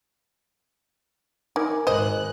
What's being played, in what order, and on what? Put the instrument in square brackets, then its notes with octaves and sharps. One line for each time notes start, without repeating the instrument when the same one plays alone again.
[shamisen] D#4 [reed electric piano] A#4 G#5 D6
[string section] G#1 F#6 [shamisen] C5 D#5